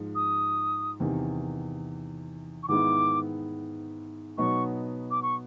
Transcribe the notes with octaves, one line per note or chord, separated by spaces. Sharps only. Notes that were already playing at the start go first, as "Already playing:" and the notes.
Already playing: G#2 F3 G#3
D#6
E2 C3 D#3
C#6
G#2 D#3 G#3 B3 E4 D6
B2 F#3 B3 D#4 C#6
D6
C#6